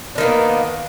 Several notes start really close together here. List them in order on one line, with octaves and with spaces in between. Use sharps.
D4 D#3 A#3 B3